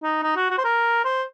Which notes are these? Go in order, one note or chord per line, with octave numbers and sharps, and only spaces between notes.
D#4
D#4
F#4
F#4
C5
A#4
C5